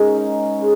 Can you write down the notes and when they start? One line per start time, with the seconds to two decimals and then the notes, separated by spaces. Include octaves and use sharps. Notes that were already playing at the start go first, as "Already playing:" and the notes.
Already playing: G#2 G#3 A#3 C#4 A#4
0.14 D#4
0.58 C#3 G#3